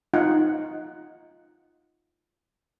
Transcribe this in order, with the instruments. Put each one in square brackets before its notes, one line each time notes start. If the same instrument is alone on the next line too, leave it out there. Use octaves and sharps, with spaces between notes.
[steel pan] D#4 F4 F#5